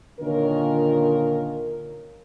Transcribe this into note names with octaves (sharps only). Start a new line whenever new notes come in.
A#2 D3 D#3 C#4 F4 A#4